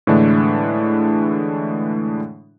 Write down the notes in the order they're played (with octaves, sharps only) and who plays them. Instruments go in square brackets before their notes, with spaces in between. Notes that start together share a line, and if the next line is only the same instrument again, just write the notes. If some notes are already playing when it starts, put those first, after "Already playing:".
[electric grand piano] A2 D3 E3 G#3 A3 D4